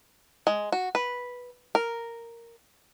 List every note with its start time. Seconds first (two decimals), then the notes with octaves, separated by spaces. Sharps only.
0.47 G#3
0.72 F#4
0.95 B4
1.75 A#4